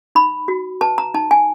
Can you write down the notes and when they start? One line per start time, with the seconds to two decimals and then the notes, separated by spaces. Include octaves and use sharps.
0.15 D#4 B5
0.48 F#4
0.81 B4 A5
0.98 A#5
1.14 D#4 A5
1.31 G#5